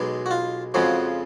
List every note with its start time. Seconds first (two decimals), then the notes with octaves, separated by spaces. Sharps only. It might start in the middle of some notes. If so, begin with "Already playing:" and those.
Already playing: B1 B2 G#3
0.26 F#4
0.31 F4
0.74 F2 C#3 F3 G#3 F#4